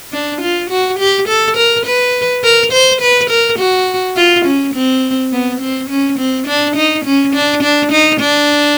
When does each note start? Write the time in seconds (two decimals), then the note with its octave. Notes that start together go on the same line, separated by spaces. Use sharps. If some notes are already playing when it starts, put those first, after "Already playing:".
0.12 D4
0.42 F4
0.70 F#4
0.99 G4
1.28 A4
1.57 A#4
1.85 B4
2.44 A#4
2.72 C5
3.01 B4
3.30 A#4
3.59 F#4
4.16 F4
4.45 C#4
4.74 C4
5.32 B3
5.60 C4
5.90 C#4
6.19 C4
6.47 D4
6.76 D#4
7.05 C#4
7.34 D4
7.63 D4
7.92 D#4
8.20 D4